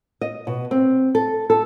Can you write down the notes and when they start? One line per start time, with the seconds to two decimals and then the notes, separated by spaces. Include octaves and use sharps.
0.21 D#5
0.47 B2
0.71 C4
1.15 A4
1.50 A4